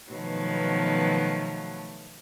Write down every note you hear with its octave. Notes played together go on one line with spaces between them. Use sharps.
B2 D#3 F3 F#3 A3 B3